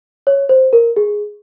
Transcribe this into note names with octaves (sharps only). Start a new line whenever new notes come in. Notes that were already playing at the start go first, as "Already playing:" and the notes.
C#5
C5
A#4
G#4